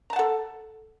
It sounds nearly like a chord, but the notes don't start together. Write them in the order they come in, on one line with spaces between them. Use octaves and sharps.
A#5 A5 F#5 A4